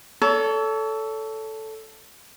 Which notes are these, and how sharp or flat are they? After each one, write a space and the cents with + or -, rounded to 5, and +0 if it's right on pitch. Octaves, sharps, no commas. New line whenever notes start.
A4 +0 C#5 +35